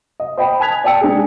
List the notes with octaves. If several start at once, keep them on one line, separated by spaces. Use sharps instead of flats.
D#5
C5 D#5 G5 B5
G#5 A5 F#6 G#6 B6 F7
D5 G5 A5 E6 C#7
G#3 D4 D#4 G4 G#4